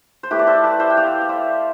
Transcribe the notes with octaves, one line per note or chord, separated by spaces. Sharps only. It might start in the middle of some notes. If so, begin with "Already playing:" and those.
C5
A3 E4 G4 B4
D5
A4 C5
B4 D5
C5 E5
G5
D5 F5
F5
C5 E5